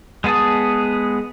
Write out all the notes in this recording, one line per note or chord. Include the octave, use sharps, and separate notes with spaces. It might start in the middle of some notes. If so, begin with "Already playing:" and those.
G#3 B3 G#4 A5 D#6